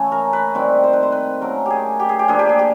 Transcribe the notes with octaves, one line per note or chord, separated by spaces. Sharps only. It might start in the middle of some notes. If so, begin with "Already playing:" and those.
Already playing: C#3 E3 A3 C#4
A#4
B4
C3 D#3 G3 C4 B4
C5
B4
C5
B4
C#3 F#3 A3 A#4
G4 G#4
G4
G#4
G4
F3 A#3 D4 G#4
G4
G#4
G4